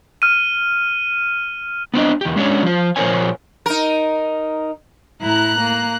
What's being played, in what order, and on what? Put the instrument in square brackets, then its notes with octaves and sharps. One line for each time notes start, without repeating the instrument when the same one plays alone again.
[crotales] F6 D#7
[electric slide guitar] B3 C4 D4 D#5
E2 G4
G#3 C#4 D4 G4 C#5
F3 C5
A#2 F3 A#4 C5 C#5 G#5
[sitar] D#4 A#4
[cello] A2 E4 [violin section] A#5 F#6
[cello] A#3